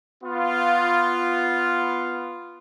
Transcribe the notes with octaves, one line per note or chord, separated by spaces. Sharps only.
B3 F4